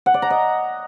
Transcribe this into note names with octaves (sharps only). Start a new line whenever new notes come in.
F#5
D5
A#5
D#5